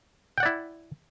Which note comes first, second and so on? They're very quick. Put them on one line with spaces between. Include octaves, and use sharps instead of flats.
G5 F#5 D5 E4